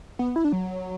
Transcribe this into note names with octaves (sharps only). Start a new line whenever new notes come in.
B3
E4
D4
F#3